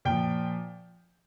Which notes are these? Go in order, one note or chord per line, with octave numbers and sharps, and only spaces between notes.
A#2 F3 G5